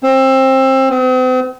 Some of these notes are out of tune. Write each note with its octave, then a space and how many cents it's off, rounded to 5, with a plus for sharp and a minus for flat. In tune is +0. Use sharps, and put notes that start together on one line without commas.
C4 +25
C4 -40